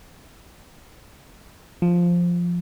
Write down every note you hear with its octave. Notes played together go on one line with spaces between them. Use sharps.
F3